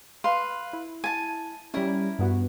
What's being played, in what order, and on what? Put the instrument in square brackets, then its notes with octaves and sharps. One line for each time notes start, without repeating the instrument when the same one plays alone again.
[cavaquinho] B4 F5 C6
[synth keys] E4
[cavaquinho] G#5 A5
[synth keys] G3 C#4 [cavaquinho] E4 A#4
[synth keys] G2 B3 F#4